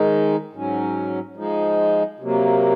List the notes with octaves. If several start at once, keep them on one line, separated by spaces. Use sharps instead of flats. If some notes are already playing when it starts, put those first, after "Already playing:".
Already playing: G#2 D#3 G#3 D#4
G#2 F#3 C#4
F3 G#3 D#4
C3 F#3 A#3